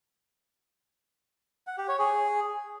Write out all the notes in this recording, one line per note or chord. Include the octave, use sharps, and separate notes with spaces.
F#5
G4
C#5
G#4